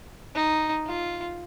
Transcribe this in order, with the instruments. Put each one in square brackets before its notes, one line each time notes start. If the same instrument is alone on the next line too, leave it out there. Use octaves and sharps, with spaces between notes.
[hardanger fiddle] D#4
F4